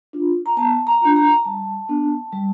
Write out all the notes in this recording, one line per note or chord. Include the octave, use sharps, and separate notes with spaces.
D4 F4
A#5
B3 A5
A#5
D4 F4
A#5
G3 A5
B3 D4
G3